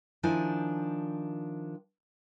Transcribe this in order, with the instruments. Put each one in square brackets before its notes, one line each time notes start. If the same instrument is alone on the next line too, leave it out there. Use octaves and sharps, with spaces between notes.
[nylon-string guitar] D#3 F3 D4 E4 C5 G#5